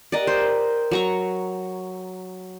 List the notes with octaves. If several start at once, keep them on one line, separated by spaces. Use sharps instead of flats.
G4 A#4 D5 D#5 F#5
C5
F#3 A#5 C#6